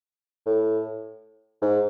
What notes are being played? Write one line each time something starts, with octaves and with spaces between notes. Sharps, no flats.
A2
G#2